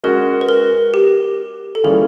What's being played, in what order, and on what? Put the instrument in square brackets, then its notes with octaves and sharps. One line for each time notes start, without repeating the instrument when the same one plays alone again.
[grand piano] G#3 C#4 F#4 [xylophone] A#4
[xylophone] B4
A#4
G4
A4
[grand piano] E3 G3 A#3 C#4 F4 [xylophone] G#4